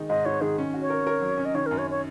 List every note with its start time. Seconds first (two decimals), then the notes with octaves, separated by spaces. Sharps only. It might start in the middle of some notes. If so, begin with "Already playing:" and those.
Already playing: D#3 G#3 D#4
0.09 G#2 D#5
0.25 D#4 C#5
0.41 D#3 G#4
0.58 C#4
0.74 F#4
0.81 C#5
0.90 A#4
1.07 A#4
1.22 F#3
1.38 C#4
1.45 D#5
1.55 D#3 C#5
1.66 F#2 A#4
1.78 C#5
1.91 C#5